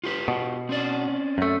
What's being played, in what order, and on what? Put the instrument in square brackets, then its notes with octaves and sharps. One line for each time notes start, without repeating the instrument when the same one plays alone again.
[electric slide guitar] F4 G4 B4
[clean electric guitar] B2
[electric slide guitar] C4 C#4 D5
[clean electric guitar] F#2 A3